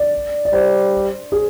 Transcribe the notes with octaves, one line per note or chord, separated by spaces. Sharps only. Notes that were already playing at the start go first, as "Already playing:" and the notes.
Already playing: D5
D5
G3 C5
G#4